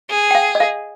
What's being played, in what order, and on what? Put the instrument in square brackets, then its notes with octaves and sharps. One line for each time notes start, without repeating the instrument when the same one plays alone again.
[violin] G#4
[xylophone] G5
F5
D#5
F5